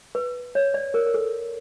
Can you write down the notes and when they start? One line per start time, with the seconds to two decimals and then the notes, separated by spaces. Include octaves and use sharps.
0.15 B4
0.55 C#5
0.74 D5
0.94 A#4
1.06 A#4
1.14 A4